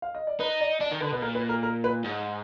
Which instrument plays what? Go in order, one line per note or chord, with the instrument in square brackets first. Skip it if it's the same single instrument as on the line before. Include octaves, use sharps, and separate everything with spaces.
[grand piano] F5
D#5
D5
[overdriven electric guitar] D#4 [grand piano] B4
[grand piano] D5
[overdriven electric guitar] D4 [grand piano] D5
[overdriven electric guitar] D#3
[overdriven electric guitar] D3 [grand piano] B4
[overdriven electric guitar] B2 [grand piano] B4
[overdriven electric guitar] A#2 [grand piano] A#4
[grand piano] B4
A#4
A#4
B4
[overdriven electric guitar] G#2